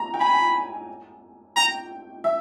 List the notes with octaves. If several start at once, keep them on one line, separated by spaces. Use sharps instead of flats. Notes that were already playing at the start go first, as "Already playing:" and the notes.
Already playing: A#5
G5
G#5 B5
G5 A#5
E5